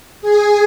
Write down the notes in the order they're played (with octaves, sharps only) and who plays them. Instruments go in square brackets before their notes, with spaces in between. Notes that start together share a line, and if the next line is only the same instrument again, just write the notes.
[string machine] G#4